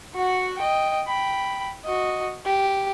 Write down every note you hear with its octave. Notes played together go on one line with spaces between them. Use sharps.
F#4 F#5
D#5 G5
G5 B5
F#4 D#5
G4